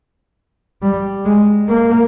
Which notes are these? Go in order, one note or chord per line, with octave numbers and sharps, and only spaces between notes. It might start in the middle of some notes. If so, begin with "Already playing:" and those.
G3
G#3
A#3